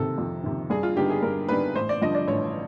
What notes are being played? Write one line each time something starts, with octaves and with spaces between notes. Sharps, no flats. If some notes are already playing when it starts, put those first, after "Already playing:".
Already playing: C3 D#3 A4
F2
C3 D#3
G2 G#4
F4
D3 G3 B3 D#4 G4
G#4
G2 A#4
D3 G3 B3 D#4 B4
A1 C5
D5
G2 D3 F3 D#5
D5
A1 C#5